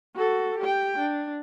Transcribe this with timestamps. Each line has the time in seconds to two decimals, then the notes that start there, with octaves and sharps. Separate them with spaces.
0.16 F#4 A4
0.59 G4 G5
0.98 D4